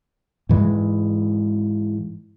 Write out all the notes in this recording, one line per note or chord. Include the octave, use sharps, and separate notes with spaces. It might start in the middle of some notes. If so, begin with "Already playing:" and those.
G#2 E3 G#3